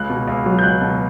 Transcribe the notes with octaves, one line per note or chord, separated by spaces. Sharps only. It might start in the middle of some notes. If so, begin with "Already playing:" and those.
Already playing: C#2 F#6
B2
C#2
F#3
G6
C#2 F#6
B2